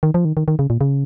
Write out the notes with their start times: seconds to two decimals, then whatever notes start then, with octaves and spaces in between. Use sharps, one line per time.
0.03 D#3
0.14 F3
0.25 D#3
0.37 D#3
0.48 D#3
0.59 C#3
0.70 A#2
0.81 C#3